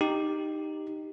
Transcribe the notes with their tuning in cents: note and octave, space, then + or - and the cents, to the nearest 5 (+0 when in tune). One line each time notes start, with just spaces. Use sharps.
D#4 -10 G4 +0